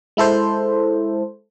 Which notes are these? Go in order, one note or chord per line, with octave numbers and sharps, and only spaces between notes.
G#3 E4 A4 C5